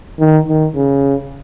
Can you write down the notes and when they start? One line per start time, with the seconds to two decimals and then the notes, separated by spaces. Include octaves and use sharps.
0.20 D#3
0.48 D#3
0.76 C#3